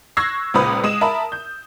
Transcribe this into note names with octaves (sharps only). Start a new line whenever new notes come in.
C#6 E6 F#6 G#6 A#6 C7
C#2 A#2 B4 C5 B5 D#6
G#3 D#6 E7
A#4 E5 A5 B5
G6